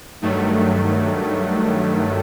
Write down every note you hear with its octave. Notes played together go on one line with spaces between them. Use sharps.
G2 D#3 F#3 A3